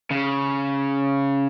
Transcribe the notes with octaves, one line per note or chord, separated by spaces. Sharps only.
C#3